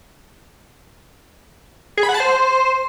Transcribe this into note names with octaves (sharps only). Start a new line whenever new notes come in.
G#4
B5
F#5
A5
C5